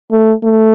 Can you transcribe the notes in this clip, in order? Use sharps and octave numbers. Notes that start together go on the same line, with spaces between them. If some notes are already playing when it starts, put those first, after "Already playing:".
A3
A3